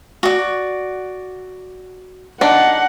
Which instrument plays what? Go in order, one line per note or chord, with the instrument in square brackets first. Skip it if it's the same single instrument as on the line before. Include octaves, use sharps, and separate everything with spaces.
[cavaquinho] F#4 D5
[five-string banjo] D4 [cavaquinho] D#4 D6 [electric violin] F#5